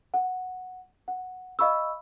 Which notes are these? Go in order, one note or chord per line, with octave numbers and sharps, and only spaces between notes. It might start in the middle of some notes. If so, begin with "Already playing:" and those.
F#5
F#5
D#5 F5 B5 C#6 E6